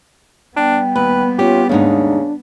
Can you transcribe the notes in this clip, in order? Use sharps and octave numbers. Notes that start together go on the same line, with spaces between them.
G3 B3 D4 G5
D#2 B4
C#4 F4 G4
D#2 G#2 C#3 D4 D#4